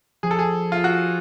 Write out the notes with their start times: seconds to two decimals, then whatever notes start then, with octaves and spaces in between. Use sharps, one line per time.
0.23 F3 G#4
0.31 A4
0.39 G#4
0.72 F4
0.84 F#4